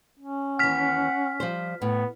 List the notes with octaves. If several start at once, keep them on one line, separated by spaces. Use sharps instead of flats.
C#4
D#2 E3 F#5 F6 B6
F3 G3 C5
A2 B3